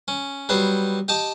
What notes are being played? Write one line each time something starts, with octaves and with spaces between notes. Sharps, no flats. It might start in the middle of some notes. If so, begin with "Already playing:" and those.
C#4
F#3 G3 B3 G4 C5
G4 D#5 G5 A5 D6